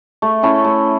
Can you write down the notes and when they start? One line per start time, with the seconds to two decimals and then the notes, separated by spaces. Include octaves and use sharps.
0.22 A3
0.43 C#4 E4 A4
0.64 A3